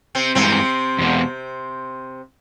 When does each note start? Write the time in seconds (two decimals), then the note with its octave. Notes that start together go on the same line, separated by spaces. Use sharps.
0.15 C3 C4
0.35 G2 C3 E3 G#3 C4
0.99 E2 B2 G#3 B3